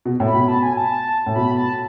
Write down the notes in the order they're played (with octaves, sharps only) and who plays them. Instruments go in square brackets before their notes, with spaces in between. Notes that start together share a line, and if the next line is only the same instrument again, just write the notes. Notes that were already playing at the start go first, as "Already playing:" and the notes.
[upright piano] B2
A2
[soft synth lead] B5
[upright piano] B2
[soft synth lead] A5
G#5
A5
[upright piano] A2
[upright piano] B2 [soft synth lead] B5
[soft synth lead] A5